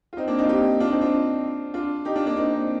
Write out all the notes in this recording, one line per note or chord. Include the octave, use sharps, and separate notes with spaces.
F4
C4 D#4
A#3 D4
C4 D#4
F4
D#4 G4
D4 F4
C4 D#4
D4 F4
D4 F4
D#4 G4
D4 F4
A#3 D4
C4 D#4
C4 D#4